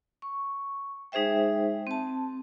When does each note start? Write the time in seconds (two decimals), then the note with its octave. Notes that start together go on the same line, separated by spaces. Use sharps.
0.22 C#6
1.12 G#3 D#4 G#4 C5 E5 G5
1.87 C4 A5